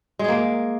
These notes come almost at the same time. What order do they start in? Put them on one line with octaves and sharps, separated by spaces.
G#3 G#4 A#3